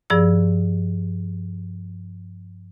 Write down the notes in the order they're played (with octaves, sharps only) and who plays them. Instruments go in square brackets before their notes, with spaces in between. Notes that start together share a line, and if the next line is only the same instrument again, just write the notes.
[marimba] G2 F3 G#4 D5 E6